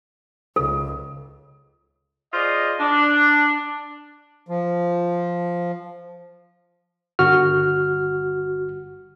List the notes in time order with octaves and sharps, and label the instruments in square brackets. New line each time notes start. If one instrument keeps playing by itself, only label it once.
[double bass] C#2 [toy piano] A4
[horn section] F4 G#4 C5 D5 D#5
D4
[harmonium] F3
[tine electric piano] G1 F#4 F6